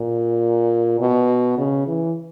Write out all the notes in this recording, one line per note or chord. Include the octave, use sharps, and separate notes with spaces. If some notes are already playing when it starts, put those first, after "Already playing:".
Already playing: A#2
B2
C#3
E3